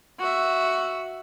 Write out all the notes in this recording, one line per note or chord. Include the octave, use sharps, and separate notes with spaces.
F#4 E5